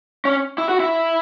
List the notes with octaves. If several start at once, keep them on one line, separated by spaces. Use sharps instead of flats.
C#4
E4
F#4
E4